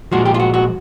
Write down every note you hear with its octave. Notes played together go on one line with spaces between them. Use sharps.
A#2 F3 G#3 F#4
G4
F4
F#4
F#4